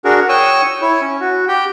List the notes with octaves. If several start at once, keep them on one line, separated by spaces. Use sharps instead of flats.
D4 F#4 G#4 A#4
C#5 G5 C#6 D#6 E6
E4 C#5
C#4
F#4
G4 G5